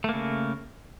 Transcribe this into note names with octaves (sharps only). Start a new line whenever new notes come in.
C#3 A3 A#3